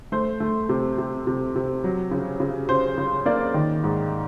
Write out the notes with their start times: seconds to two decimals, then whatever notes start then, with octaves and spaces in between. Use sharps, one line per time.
0.12 A3 C5
0.40 A3
0.69 C3
0.98 C3
1.27 C3
1.55 C3
1.84 F#3
2.11 C#3
2.40 C#3
2.69 C#3 C5
2.98 C#3
3.26 A#3 D5
3.54 D#3
3.84 G#2